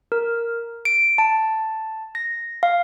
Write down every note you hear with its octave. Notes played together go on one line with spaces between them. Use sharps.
A#4
D7
A5
A#6
F5